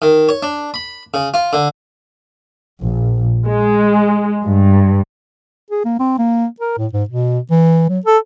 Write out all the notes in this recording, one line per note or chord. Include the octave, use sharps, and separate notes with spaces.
D#3
C#5
D4
B5
C#3
F4
D3
A#1
G#3
G2
G#4
A#3
C4
A#3
A#4
A2
G#2
B2
E3
F#3
A4